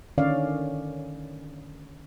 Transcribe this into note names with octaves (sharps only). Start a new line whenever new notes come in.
D3 D#3 C#4 C#5 D5 F5